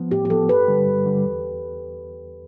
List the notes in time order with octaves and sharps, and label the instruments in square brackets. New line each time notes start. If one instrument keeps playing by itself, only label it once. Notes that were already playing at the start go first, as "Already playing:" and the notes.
Already playing: [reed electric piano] F3 B3
[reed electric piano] A2 [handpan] G4
[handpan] G4
[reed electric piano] F3 B3 [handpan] A4
[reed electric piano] G2 [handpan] B4
[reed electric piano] D3 G3
G2
D3 G3
E2